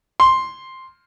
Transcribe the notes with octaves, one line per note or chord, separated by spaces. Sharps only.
C6